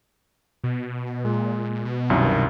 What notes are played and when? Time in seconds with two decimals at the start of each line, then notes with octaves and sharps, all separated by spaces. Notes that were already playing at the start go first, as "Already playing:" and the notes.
0.64 B2
1.25 A#2 G#3
1.85 B2
2.10 C2 F#2 D#3